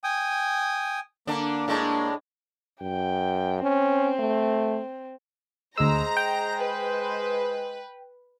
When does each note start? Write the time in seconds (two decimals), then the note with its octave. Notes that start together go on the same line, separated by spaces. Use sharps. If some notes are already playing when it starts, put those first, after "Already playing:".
0.04 G5 G#5 D#6
1.27 D3 A#3 D4
1.68 A2 G#3 D4
2.82 F#2 G5
3.63 C4 C#4
4.19 A3
5.78 D2 G#3 C5 A#5 E6
6.17 G5
6.64 B4